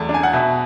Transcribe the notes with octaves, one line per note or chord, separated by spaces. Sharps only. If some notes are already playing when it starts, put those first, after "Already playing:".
Already playing: E2 A3 A5
D4
G#5
F#5
B2 E5